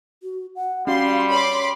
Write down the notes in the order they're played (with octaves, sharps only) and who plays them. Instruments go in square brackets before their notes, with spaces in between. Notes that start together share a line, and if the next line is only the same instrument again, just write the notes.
[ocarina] F#4
F#5
[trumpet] G3 [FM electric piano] C#4 F#4 [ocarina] F5 [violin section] C6
[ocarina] C#5 [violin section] B5 C6 D6